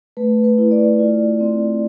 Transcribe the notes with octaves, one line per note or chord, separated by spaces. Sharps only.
A3 B4
B4
E4
D5
F4 D5
C4